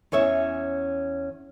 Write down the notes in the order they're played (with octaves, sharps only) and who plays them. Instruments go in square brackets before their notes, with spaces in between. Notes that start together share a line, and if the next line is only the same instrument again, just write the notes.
[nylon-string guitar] E2 C#4 C#5 E5